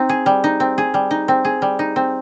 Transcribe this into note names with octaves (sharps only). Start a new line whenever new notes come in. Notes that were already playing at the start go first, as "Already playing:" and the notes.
Already playing: C4 D#4
G#4
G3
D#4
C4
G#4
G3
D#4
C4
G#4
G3
D#4
C4